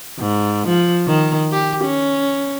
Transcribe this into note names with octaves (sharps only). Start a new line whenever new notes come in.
G#2
F3
D#3
G4
C#4